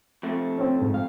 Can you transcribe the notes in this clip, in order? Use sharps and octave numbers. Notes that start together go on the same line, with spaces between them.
F2 A3
C4 C#4
G#2
F5